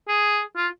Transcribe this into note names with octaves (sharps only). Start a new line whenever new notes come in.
G#4
F4